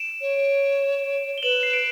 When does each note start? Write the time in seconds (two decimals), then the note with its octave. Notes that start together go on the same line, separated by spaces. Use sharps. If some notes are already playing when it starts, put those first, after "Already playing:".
Already playing: D7 E7
0.21 C#5
1.38 G7
1.43 B4 E7 F#7
1.63 C7
1.73 D7